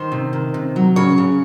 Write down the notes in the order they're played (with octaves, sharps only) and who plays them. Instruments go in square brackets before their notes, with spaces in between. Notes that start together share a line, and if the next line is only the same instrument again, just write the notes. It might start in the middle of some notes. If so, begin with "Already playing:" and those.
Already playing: [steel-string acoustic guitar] D#3 C5
C3
D#3
C3
F#3
C#3 C#5
C#3